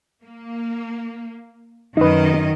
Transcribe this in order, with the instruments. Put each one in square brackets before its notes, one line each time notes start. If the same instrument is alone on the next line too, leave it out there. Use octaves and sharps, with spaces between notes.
[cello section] A#3
[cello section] F#2 D#3 D#5 [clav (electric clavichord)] D#4 B4